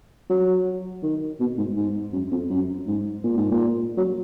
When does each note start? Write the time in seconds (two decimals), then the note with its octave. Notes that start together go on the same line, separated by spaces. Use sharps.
0.30 F#3
1.03 D#3
1.40 B2
1.58 G#2
1.76 G#2
2.13 F#2
2.32 F2
2.50 F#2
2.87 G#2
3.24 A#2
3.37 G#2
3.51 A#2
3.97 F#3